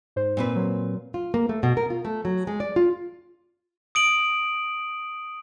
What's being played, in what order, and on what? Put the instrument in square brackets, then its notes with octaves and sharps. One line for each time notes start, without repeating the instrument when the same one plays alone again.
[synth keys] G#2 C5
[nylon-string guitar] A#2 C4 B4
[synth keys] F#3 A#3
[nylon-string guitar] F4
A#3
A3
B2
A#4
F4
A3
F#3
G#3
D5
F4
[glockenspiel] D#6 D7 F#7